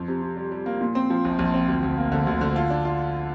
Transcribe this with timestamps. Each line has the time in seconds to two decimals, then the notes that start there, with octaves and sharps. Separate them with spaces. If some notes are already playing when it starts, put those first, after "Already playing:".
Already playing: F2
0.08 C3
0.22 C3
0.37 G3
0.52 G3
0.66 A#3
0.81 A#2
0.95 C4
1.10 F3
1.25 A#1
1.39 A#1
1.54 C4
1.68 D2
1.83 D2
1.98 A#3
2.12 D3
2.27 D2
2.41 D3
2.56 F4
2.70 D4
2.85 F4